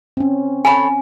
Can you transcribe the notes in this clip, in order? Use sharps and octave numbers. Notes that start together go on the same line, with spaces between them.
C4 C#4
A4 C#5 G#5 B5